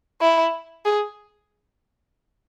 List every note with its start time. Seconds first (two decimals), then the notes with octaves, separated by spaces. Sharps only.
0.21 E4
0.85 G#4